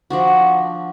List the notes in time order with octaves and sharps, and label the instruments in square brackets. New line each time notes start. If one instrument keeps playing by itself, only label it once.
[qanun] F3 D4 F#4